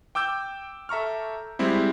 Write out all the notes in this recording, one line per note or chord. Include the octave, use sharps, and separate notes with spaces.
G5 D6 E6 G6
A4 E5 A#5 C#6 F6
G3 G#3 C4 E4